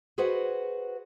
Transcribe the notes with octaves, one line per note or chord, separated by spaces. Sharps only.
F#4 G#4 B4 C5 D#5 F#5